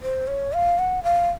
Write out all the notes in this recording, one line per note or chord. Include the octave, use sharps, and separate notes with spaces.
C5
C#5
F5
F#5
F5